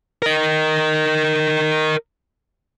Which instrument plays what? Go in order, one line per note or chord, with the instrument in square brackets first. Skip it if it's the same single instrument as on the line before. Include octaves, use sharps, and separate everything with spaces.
[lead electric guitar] A#4 D#5